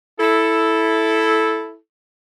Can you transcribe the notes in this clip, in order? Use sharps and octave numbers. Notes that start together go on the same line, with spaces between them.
E4 A4